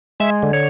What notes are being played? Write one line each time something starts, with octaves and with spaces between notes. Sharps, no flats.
G#3 E5
D3
C#5